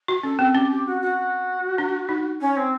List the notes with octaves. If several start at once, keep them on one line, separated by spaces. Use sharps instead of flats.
F#4
C#4 A4
C4
C#4 G4
G4
F#4
F#4
D4
D#4
C#4
C4